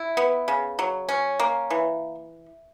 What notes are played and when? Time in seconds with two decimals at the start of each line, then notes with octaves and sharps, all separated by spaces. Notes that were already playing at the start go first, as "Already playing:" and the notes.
Already playing: E4
0.17 B3
0.48 C#3
0.79 F#3
1.09 C#4
1.40 A#3
1.70 E3